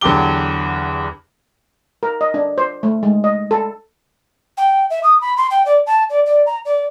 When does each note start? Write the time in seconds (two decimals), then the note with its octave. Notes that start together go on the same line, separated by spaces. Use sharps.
0.01 E2 D3 F#3 G4 D6 G7
2.03 A#4
2.21 D#5
2.34 D4
2.58 C5
2.83 A3
3.03 G#3
3.24 D#5
3.51 A4
4.57 G5
4.90 E5
5.03 D#6
5.21 B5
5.37 C6
5.50 G5
5.65 D5
5.86 A5
6.09 D5
6.25 D5
6.46 A#5
6.65 D5